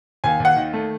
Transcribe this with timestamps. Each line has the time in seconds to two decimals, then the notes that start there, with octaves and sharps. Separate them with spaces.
0.24 D#2 G#5
0.40 D#2
0.45 F#5
0.56 D#3
0.73 A3